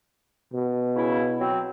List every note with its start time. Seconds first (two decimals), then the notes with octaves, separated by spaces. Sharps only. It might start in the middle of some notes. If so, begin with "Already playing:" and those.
0.53 B2
0.96 C#3 E4
1.40 F#3 C4